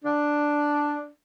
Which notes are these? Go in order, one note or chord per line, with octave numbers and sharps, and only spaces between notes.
D4